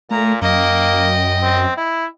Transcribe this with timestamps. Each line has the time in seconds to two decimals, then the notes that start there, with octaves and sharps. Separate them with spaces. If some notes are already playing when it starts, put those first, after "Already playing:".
0.11 A#2 A3 A#5
0.42 F#2 A#3 D#5 G5
1.43 C4
1.77 E4